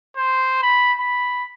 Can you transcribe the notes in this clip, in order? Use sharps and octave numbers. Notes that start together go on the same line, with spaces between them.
C5
B5
B5